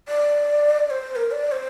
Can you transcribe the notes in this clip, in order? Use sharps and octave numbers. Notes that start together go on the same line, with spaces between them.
D5
D5
C5
A#4
D5
D5
C5